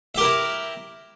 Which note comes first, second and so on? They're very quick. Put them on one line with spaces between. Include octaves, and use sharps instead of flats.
E5 G4 A#4 E4